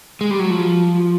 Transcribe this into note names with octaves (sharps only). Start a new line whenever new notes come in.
G#3
G3
F#3
F3